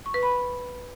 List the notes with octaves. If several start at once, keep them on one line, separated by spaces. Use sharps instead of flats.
C#6
B4
B5